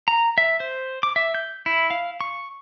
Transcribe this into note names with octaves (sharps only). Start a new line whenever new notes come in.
A#5
E5
C5
D6
E5
G6
E4
F5
C#6